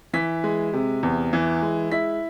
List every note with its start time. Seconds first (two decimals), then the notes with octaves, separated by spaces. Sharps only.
0.14 E3 B6
0.44 G#3
0.73 C3
1.03 E2
1.33 E3
1.62 G#3
1.92 E4 B6